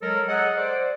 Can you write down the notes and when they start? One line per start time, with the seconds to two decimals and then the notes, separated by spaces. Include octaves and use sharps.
0.02 F#3 G#3 A4 A#4
0.28 G#4 A4 C#5 D#5 F#5
0.57 C5 D5